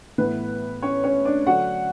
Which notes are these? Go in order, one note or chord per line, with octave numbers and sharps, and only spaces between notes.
A2 E3 B3 B4
C#4 C#5
C#4 C#5
D4 D5
D3 F#3 A3 D4 F#4 F#5